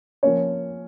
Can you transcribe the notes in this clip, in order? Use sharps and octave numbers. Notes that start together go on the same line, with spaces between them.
F3 A#3 C#4 C#5